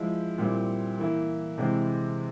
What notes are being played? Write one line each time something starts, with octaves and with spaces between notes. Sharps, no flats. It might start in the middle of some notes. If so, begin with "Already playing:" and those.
Already playing: F3 G#3 E4
A#2 G3 C4 E4
E3 A#3 E4
C3 E3 G#3 C4 E4